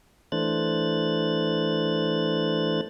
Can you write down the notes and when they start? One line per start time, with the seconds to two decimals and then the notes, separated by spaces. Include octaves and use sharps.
0.32 E3 A3 D4 C5 F#6 A6